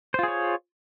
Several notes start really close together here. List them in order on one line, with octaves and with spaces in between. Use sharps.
C5 F4 G#4 C#5